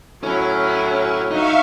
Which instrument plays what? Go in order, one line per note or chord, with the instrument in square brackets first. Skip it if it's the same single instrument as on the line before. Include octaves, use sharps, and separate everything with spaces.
[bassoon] A2 [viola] F#3 E4 [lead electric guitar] C#4
[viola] F#3 [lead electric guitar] D#4 [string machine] E5 F5 C#6